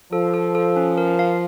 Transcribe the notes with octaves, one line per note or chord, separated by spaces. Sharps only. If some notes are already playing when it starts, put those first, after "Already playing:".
F3 A4
A4
A4
C#4
A#4
F5